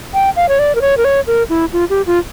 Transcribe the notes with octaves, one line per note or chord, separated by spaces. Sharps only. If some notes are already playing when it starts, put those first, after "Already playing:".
G5
F5
C#5
D5
A#4
C#5
A#4
C#5
A#4
E4
F4
G4
F4